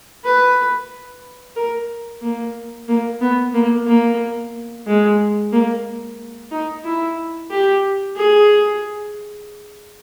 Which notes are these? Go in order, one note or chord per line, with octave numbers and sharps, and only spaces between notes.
B4
A#4
A#3
A#3
B3
A#3
A#3
G#3
A#3
D#4
E4
G4
G#4